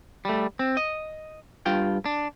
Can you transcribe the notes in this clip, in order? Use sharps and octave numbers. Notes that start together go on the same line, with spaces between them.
G3 A3
C4
D#5
G2 F4 G5
D4